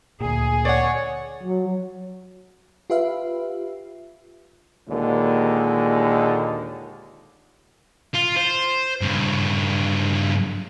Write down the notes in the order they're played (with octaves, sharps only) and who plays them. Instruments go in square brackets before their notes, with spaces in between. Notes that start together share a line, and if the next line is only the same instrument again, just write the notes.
[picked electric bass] D2 A#2 [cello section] G#4
[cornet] C#5 [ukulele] D5 F#5
[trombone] F#3
[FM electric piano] F4 G4 B4 E5 F5
[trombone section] D#2 A#2 D3 G#3
[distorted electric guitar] F4
C5
G2 C#3